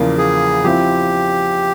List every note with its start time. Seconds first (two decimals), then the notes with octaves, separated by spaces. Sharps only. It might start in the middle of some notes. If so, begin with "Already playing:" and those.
Already playing: E2 C#3 F3 A#3 F4
0.18 G#4
0.64 F3 C4 E4 G4